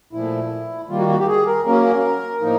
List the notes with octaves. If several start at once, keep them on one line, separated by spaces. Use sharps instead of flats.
A#2 F3 A3 E4
D#3 G3 A#3 F4
F#4
F#4
G4
G#4
A#4
F#3 A#3 C#4 A#4
A2 F3 A#3 D#4